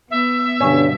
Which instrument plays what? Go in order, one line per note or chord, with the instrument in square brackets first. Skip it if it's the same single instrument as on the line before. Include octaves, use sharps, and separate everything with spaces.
[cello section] B3 [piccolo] E5
[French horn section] G2 D3 [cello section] B2 [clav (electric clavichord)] C#4